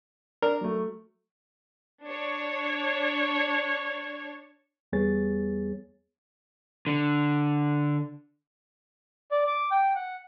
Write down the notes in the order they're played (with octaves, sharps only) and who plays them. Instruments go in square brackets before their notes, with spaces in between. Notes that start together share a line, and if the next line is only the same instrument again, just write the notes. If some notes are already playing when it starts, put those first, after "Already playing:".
[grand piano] D4 [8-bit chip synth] A#4
[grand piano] F#3 A3
[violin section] D4 C#5
[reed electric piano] E2 G3 B3 G#4 C#5 A6
[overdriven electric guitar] D3
[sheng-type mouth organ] D5
D6
G5
F#5